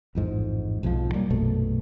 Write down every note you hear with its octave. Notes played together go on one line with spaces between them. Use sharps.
A1 F2 G#2
B1 F2 G#2 F3
F#3 G3 A#3
A#1 F#2 B2 A3